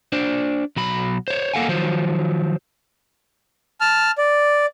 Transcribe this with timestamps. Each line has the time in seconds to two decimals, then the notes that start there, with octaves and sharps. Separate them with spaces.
0.12 D4 C5 D5
0.76 B1 F#3 B5
1.28 C5 C#5
1.53 A#3 G4 A4 F5 F#5 G#5
1.69 D#3 F3 F#3 C5
3.81 A5 F6
4.18 D5